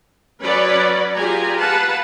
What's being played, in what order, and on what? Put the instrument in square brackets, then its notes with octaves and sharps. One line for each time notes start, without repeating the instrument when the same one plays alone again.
[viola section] F#3 C#4 B4 C#5 D5 B5
F4 G4 G#4 G#5 A#5
B4 F5 F#5 A5